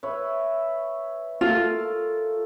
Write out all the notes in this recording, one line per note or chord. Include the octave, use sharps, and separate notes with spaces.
B4 C#5 E5
F4 A4 A#4